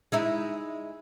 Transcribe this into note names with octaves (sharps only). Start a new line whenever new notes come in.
G#3 D#4 E4